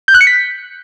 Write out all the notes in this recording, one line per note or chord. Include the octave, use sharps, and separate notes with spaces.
G6
F#6
C#7
B6